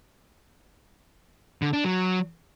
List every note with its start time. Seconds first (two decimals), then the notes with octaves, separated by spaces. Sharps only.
1.62 D3
1.73 D4
1.84 F#3